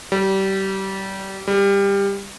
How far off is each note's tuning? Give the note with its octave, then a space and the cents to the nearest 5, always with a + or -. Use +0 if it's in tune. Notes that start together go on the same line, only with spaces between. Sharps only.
G3 -25
G3 +20